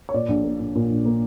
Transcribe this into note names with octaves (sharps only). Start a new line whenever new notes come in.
C#5
A#2 D5
A#1
A#3
A#1
A#2
A#1
A#3